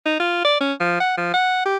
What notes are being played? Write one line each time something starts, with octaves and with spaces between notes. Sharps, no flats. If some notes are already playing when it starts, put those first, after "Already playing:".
D#4
F4
D5
C#4
F3
F#5
F3
F#5
G4